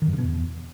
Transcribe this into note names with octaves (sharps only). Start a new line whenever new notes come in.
D#3
F#2
C#3
B2
E2